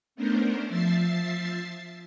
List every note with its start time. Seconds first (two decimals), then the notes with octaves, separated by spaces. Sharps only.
0.15 A3 B3 C#4 D4 A#4 C5
0.69 F3 E5 A6 C7